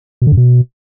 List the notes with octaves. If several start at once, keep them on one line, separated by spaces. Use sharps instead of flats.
B2
D3
F#2
B2